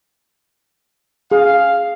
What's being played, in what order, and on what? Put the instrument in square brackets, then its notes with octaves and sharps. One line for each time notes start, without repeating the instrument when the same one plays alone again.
[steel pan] G#4 [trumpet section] F5